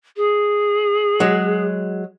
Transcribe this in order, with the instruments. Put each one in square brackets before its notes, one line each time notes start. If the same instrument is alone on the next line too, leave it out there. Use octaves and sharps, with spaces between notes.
[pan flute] G#4
[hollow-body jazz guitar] F#3 G#3